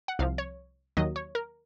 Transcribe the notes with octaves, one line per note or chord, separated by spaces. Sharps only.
F#5
C2 C3 F3 F5
C#5
D#2 D#3 F#3 D#5
C#5
A#4